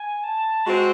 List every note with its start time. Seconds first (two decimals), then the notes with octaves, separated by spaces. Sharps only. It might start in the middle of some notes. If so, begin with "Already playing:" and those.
Already playing: G#5
0.24 A5
0.66 G#3 C4 F#4 C6